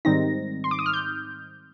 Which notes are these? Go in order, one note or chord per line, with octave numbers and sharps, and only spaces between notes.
G#2 D#3 G3 C4 D#4 A#6
C6
D6
D#6
F6
G6